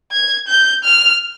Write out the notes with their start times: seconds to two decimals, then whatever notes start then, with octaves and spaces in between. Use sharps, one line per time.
0.12 G#6
0.48 G6
0.85 F6